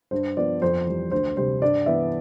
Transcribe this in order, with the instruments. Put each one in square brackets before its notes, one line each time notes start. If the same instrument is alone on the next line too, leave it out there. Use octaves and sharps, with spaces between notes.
[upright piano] G2 C5
F3 B3 D5
F2 C5
E3 G3
D2 C5
C3 G3 C5
G2 D5
E3 B3 E5